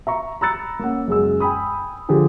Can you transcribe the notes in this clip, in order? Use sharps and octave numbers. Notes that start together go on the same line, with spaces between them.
E5 A#5 C#6
A#5 B5 E6 F#6 A6 C#7
A#3 C#4 F#5
F#2 C#3 G#3 G#4 E6
G5 G#5 B5 D#6
D3 F3 G4 G#4